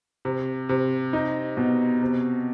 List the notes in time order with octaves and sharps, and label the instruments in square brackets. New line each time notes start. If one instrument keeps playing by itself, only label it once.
[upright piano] C3
C3
D#4
B2
C3